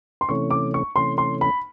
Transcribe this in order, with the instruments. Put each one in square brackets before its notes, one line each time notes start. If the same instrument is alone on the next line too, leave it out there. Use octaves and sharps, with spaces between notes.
[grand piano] C6
[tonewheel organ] C3 E3 A3 C#4 [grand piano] C#6
[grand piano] D6
C#6
[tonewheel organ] C3 E3 A3 C#4 [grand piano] C6
[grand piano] C6
B5